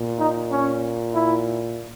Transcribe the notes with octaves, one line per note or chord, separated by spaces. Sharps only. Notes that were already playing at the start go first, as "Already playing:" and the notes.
Already playing: A#2
D#4
C#4
E4